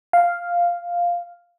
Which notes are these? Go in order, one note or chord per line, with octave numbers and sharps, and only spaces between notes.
F5